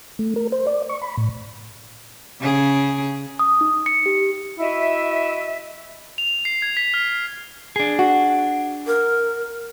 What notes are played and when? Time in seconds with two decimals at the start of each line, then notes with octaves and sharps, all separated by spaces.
0.19 A3
0.36 A#4
0.52 C5
0.67 D5
0.89 C#6
1.02 B5
1.17 A2
2.40 C#3 G#4
3.39 D#6
3.61 D#4
3.86 C#7
4.06 G4
4.60 E4 F#4 D#5 E5
6.18 F7
6.45 C7
6.62 G#6
6.77 B6
6.94 F6
7.76 D4 G#4
7.99 F#4
8.87 A#4